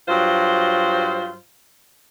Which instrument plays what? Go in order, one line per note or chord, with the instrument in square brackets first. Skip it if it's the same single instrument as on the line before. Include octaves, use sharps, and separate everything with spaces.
[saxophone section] G2 F#3 F4 C5